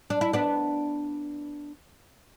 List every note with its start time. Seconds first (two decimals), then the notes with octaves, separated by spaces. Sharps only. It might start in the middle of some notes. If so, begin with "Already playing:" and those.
0.10 D4
0.21 E4
0.33 B3 D4